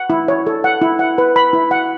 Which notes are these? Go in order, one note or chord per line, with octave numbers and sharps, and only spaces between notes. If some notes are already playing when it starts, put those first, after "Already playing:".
Already playing: F#5
E4
C#5
A4
F#5
E4
F#5
B4
B5
E4
F#5